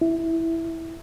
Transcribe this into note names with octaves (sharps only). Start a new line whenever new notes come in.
E4